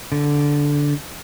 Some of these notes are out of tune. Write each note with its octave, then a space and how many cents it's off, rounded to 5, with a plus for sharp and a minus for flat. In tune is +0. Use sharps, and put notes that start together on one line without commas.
D3 -10